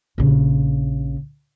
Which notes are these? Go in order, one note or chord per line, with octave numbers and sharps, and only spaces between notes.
A#1 C#3